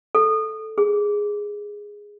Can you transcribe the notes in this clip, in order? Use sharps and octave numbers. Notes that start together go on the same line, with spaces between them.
A4
G#4